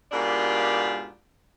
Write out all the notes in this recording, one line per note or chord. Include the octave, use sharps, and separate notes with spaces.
G#2 B2 A#3 D4 F4 G4